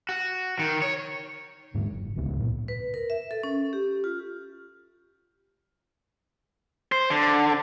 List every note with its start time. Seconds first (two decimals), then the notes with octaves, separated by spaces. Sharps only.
0.09 F#4
0.59 D#3
0.82 C#5
1.74 D#1 G#2 D3 G#3
1.92 F#1
2.16 D#1 C#2 G#2 B3
2.38 F#2 A#2
2.68 B4
2.94 A#4
3.10 E5
3.31 A4
3.43 C#4
3.73 G4
4.04 F4
6.92 C5
7.10 D3